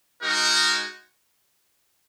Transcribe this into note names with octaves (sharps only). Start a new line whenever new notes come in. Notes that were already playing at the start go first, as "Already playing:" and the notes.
G#3 D#4 F#4 A#4